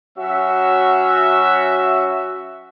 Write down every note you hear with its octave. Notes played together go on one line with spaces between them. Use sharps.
F#3 C#4 F#4 E5